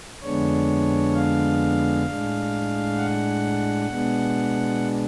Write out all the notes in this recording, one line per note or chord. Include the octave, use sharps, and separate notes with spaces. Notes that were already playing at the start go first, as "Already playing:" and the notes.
F2 D3 G#3 B3 D4 C#5
F5
A2 G#3 D4
F#5
B2 G#3 B3 D4